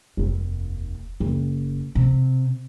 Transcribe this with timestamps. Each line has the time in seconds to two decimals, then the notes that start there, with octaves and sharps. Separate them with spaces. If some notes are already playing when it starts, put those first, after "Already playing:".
0.17 F1 D#2
1.20 F#1
1.95 C3